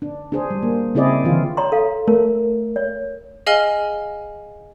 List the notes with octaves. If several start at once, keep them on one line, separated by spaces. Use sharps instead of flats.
D4
D4 G#4 C5
G3
A#3
C#3 C4 E4 G#4 D5 D#5
D3 E3 F4
C#5 A#5 C6
A4 F5
A3 A#4
C#5
G#4 D#5 F5 G#5 F6 G7